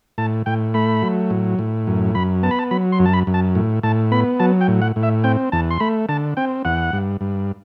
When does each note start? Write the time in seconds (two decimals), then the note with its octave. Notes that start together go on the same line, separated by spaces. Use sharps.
0.18 A2 A5
0.46 A2 G5
0.74 A3 B5
1.02 F#3
1.30 A2
1.59 A2
1.87 F#2
2.15 F#2 B5
2.43 B3 A5
2.51 B5
2.59 A5
2.71 F#3 B5
2.92 C6
2.99 F#2
3.06 A5
3.13 B5
3.27 F#2
3.34 A5
3.55 A2
3.83 A2 A5
4.11 B3 B5
4.40 F#3 A5
4.61 G5
4.68 A2
4.82 F#5
4.96 A2
5.03 E5
5.24 C4 G5
5.52 E2 A5
5.71 C6
5.80 A3 B5
6.09 D3 A5
6.37 C4 G5
6.65 E2 F#5
6.93 G2
7.21 G2